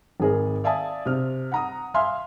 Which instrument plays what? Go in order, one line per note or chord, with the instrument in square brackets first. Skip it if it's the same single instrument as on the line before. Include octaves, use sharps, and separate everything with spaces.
[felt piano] G#1 G#4 A#4
D5 E5 F5 G#5 A5 D#6
C3 F6
F#5 A#5 D#6
E5 F5 G#5 C6 F6